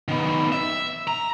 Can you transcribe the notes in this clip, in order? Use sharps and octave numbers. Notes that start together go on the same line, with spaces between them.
D#3 B3
E5
A#5